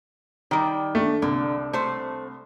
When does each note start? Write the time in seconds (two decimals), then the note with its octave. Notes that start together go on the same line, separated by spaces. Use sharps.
0.51 D#3 G3
0.95 A3 D4
1.22 C2 D3
1.73 A3 C5